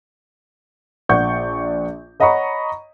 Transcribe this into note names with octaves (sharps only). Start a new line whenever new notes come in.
A#1 D5 F#5 C#6 G6
C#5 D#5 F#5 A#5 B5 C#6